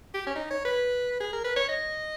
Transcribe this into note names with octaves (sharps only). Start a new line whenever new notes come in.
G4
C#4
D#4
C#5
B4
G#4
A#4
B4
C#5
D#5